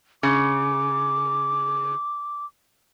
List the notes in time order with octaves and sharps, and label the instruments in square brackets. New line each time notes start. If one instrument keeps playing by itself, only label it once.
[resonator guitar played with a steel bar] C#3 [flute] D6